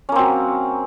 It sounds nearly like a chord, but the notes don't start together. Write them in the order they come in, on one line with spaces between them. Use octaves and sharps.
C#4 A#3 C4 F#3